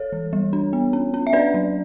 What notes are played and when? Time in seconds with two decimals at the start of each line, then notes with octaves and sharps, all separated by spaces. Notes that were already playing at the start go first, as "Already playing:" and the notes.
Already playing: A4 C#5
0.13 E3
0.33 G3
0.53 D4
0.73 B3
0.93 C#4
1.14 C#4
1.27 E5
1.33 D4 B4 D5
1.54 F#3